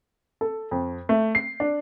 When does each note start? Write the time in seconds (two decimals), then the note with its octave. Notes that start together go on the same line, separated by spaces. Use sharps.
0.41 A4
0.71 F2
1.09 A3
1.35 C7
1.60 D4